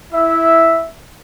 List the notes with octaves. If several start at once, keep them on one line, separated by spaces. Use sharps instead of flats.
E4 E5